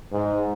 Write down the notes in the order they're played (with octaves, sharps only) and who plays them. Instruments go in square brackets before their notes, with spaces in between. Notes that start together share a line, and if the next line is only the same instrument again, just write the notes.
[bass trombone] G#2